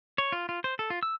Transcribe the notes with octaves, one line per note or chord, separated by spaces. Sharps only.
C#5
F4
F4
C5
A4
F4
E6